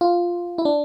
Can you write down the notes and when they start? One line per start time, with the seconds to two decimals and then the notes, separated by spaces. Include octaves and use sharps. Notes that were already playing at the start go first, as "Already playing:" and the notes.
0.01 F4
0.58 E4
0.65 D4